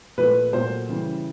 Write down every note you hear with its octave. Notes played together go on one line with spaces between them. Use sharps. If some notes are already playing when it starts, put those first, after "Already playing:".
A#2 F3 A3 B4
A#2 F#3 A3 C5
C#3 E3 G3